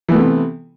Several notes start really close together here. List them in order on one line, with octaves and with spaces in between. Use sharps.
E3 B3 A3 C3